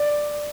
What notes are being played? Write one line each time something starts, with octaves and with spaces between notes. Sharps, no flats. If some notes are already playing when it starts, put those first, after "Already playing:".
Already playing: D5